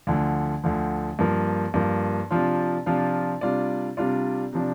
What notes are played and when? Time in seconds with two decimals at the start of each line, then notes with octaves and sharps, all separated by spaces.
0.07 D2 D3 F3
0.64 D2 D3 F3
1.19 G2 F3 A#3
1.74 G2 F3 A#3
2.31 C3 F3 D4 F4
2.86 C3 F3 D4 F4
3.41 C3 G3 D4 F4 D5
3.97 C3 G3 D4 F4 D5
4.53 C3 F3 D4